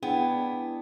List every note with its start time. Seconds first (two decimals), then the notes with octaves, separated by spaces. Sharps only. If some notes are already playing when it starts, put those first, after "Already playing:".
0.03 B3 D4 E4 G#4 G5